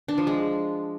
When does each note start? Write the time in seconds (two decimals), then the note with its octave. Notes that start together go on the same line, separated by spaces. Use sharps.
0.08 D4
0.18 F3
0.27 G#3